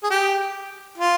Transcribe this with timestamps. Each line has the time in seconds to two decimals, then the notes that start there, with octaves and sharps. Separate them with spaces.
0.03 G#4
0.10 G4
0.98 F4